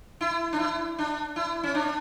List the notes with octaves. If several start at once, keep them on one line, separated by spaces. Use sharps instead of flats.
E4
D4
E4
D4
E4
C#4
D4